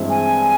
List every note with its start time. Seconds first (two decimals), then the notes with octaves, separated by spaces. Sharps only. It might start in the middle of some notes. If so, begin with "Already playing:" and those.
Already playing: G2 E3 G#3 C4 E4
0.10 G#5